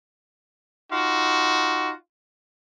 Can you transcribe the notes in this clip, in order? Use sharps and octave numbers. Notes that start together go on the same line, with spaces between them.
D#4 F4 F#4